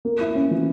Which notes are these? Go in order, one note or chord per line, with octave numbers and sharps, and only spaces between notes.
A#3
E4
C#4
E3